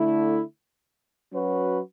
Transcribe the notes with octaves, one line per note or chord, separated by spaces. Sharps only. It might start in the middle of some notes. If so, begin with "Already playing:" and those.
Already playing: D3 A3 E4
F#3 C#4 F#4 B4